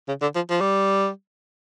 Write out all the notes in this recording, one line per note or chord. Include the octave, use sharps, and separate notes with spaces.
C#3
D3
F3
F3
G3